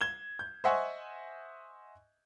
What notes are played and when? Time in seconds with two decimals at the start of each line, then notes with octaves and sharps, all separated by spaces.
0.01 G#6 E7 G7
0.39 G6
0.64 C5 D#5 E5 F#5 G#5 C#6